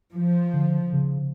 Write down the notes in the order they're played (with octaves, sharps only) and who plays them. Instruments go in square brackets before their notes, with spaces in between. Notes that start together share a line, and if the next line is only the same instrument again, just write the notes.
[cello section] F3
[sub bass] D3
C#3